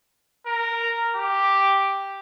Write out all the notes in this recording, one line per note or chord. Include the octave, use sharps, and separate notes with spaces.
A#4
G4